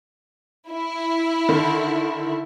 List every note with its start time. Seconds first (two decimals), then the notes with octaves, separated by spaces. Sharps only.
0.70 E4
1.48 D3 D#3